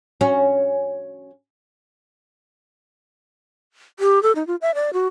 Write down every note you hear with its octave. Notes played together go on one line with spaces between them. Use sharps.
C#4 F#4
G4
A4
D#4
F4
E5
D5
F#4